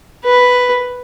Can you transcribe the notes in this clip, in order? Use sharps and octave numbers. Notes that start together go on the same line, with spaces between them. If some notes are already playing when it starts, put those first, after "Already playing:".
B4